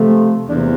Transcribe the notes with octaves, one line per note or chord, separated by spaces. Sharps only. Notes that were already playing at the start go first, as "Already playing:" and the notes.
Already playing: C3 F3 A3
E2 C3 E3 A#3 D4